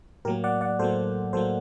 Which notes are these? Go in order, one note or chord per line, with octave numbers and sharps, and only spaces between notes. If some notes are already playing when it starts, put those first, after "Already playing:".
A2 F#3 A#3 G4 A#4
D5 F#5
D5 F#5
A2 F#3 A#3 A4 C5
A2 F#3 A#3 A4 C5